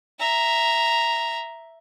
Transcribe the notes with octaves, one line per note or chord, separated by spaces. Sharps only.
E5 A#5